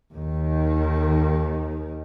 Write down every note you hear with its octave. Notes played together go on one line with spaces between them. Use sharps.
D#2 D#3